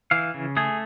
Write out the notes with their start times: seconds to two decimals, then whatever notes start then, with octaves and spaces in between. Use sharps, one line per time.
0.11 E3 F5
0.34 C#3
0.57 A3 G#4